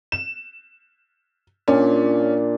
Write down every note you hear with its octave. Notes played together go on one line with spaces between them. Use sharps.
E7
A#2 C#4 D4 F4